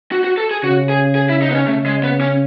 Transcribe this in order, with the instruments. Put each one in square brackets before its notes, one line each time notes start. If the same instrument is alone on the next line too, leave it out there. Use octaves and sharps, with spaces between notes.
[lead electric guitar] F#4
F#4
A4
G#4
[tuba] C#3 [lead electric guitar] F#4
[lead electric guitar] G#4
G#4
E4
D#4
B3
C#4
[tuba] C#3 [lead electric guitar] A3
[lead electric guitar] G#3
B3
C#4